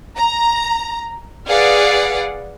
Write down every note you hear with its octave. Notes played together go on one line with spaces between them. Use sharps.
A#5
G#4 B4 D5 F5 F#5